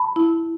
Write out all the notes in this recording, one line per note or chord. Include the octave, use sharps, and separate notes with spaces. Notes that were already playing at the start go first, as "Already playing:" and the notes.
Already playing: A5 B5
E4